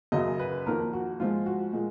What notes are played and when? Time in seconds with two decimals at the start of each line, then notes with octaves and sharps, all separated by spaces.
0.12 F#2 C#3 F#3 D#5
0.39 B4
0.66 F2 D#3 A#3 A#4
0.93 F#4
1.20 G#2 F3 G#3 F4
1.46 F#4
1.73 A#2 G#3